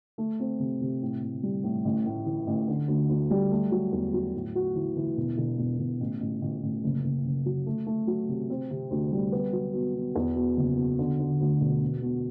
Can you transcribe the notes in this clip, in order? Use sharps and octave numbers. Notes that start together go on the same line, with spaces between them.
A3
C4
C3
C3
A2
A2
G3
A2
A1
A2
E3
A1
D3
D2
D2
G3
A3
F#3
E2
F#3
A2
F#4
E3
E3
E1
E1
E1
E1
A1
A1
A1
A1
F#1
F#1
F#1
F#3
A3
A3
F#3
C3
C4
C3
D2
G3
B3
F#3
B2
B2
E2
B2
F#1
B2
D3
D3
D2
E1
B2
B2